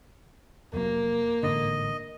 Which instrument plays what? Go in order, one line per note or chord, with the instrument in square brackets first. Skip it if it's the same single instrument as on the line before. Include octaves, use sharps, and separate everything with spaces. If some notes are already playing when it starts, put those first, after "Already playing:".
[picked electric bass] F1 F#3 [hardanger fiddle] A#3
[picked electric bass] A1 G#2 D3 [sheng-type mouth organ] D#5